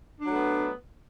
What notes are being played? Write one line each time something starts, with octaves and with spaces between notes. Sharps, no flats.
F#3 A3 B3 D4